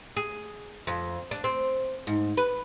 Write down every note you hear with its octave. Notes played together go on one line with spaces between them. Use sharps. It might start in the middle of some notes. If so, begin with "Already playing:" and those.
G#4
F2
D4
C4
G#2
B4